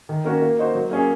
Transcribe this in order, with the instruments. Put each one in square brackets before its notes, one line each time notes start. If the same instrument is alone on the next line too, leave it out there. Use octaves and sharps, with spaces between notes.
[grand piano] D#3
A#3 C#4 F#4 A#4
A#3
D#4 F#4 C5
F#3
A#3 C#4 G#4